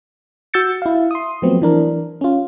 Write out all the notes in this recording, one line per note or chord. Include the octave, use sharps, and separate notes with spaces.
F#4 E6 G6 A6 C#7
E4 F5
C6 D#6
F3 F#3 A3 B3 C4
E3 D4 A#4
C#4 F4